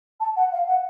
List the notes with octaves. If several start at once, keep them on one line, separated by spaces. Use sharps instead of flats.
A5
F#5
F5
F#5